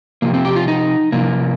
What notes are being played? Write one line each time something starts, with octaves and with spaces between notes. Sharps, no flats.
C3 F3 A#3
C4
G4
F4
D#4
C3 F3 A#3